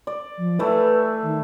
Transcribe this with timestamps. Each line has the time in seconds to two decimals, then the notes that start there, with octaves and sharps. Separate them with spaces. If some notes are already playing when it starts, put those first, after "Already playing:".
0.07 D5
0.37 F3
0.59 E3 A3 B4 E5
1.22 D#3